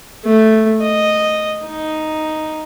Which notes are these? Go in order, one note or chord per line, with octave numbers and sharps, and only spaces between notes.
A3
D#5
D#4